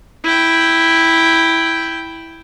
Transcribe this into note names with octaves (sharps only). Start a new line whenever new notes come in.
E4 G5